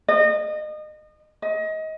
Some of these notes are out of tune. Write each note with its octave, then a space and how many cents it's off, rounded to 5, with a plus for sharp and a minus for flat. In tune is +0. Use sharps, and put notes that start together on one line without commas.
D#5 -30
D#5 +25